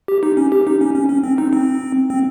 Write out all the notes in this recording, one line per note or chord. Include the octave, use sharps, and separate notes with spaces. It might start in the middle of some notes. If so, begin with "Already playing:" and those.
G4
D#4
C#4
G4
D#4
C#4
C#4
C#4
C4
D#4
C4
C4